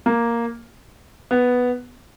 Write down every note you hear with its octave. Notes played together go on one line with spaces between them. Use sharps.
A#3
B3